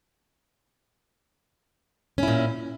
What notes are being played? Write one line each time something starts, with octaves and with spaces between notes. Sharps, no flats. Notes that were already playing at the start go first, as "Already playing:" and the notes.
A#2 C#4 E4